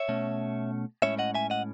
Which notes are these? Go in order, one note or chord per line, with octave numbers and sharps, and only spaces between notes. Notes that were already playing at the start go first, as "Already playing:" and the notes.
Already playing: C#5 E5
B2 A3 C#4
A2 G#3 C#4 C#5 E5
D#5 F#5
E5 G#5
D#5 F#5